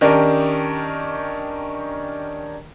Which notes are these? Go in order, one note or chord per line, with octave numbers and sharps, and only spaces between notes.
D#3 C#4 D4 G4 A#4